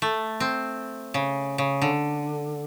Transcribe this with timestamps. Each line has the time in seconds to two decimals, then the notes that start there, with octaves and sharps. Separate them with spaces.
0.02 A3
0.40 C4
1.14 C#3
1.58 C#3
1.82 D3